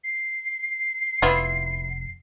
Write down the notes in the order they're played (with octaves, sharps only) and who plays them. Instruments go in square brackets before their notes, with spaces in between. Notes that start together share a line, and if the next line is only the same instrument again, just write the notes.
[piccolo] C7
[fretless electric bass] F1 [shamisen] B3 E4 F4